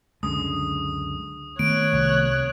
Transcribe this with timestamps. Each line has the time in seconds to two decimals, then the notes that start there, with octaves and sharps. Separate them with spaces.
0.23 C#2 F#2 D3 G#3 D#6
1.59 D#3 A3 B3 C#5 F#6 D7
1.93 C2